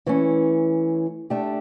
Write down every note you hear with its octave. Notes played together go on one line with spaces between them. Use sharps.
E3 A3 C#4
A3 D4 G4